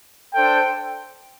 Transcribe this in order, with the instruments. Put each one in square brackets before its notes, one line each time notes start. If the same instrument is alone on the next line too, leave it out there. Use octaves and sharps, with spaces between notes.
[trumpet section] D4 A4 C5 G5